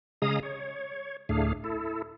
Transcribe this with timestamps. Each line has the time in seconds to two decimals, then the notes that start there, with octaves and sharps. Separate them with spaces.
0.22 C#3 G#3 G#4 F5 A#5 D#6
0.43 C#5
1.29 D2 A2 A3 D4 G#4 F5
1.64 E4 A4